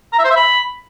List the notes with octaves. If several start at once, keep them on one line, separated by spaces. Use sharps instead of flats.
A#5
E5
C5
E5
B5